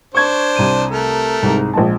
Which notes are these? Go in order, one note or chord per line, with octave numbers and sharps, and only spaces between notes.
D4 C5 C#6 G#6
C2 D#7
A3 A#4
C2 G#2
A#1 G#3 A5